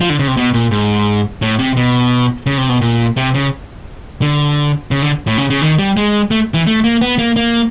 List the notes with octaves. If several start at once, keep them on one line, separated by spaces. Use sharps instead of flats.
F3
D3
C#3
C3
B2
A#2
G#2
A2
C3
B2
C#3
C3
B2
A#2
C3
C#3
D3
C#3
D3
A2
C#3
C#3
D#3
G3
G#3
A3
E3
A3
A#3
B3
A#3
A#3